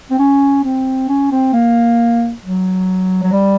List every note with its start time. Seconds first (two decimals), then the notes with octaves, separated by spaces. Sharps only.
0.11 C4
0.19 C#4
0.63 C4
1.08 C#4
1.32 C4
1.53 A#3
2.43 F#3
3.23 F#3
3.32 G3